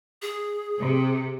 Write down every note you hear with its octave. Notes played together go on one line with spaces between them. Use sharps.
G#4
C3